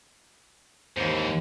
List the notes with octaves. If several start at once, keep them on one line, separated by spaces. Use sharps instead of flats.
D#2 G#2 E3 C5